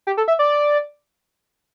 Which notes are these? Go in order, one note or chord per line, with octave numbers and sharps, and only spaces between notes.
G4
A4
E5
D5